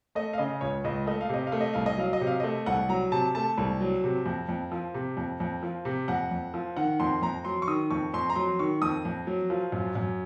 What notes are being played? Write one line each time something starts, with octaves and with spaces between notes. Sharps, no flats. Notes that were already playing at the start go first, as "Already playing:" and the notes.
A3 D#5
F5
C#3 D#5
C#2 C#5
C#2 D#5
A3 D#5
F5
C3 D#5
F5
A3
D#5
C2 F5
D#5
F#3 F5
D#5
C3
F5
A3 D#5
C2 F#5
F#3 A#5
C3 A5
A3 A5
C2
F#3
C3
F2
F2
F3
C3
F2
F2
F3
C3
F2 F#5
F2
F3
D#3 F#5
F2 C6
F2 A#5
F#3 C6
C#6
D#3 D#6
F2 C#6
F2 C6
A#5
F#3 C6
D#3 C#6
F2 D#6
F2
F#3
F3
F#2
F#2